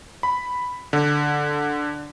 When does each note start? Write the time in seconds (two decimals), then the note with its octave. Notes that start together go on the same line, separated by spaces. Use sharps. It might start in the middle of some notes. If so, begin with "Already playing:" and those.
0.23 B5
0.93 D3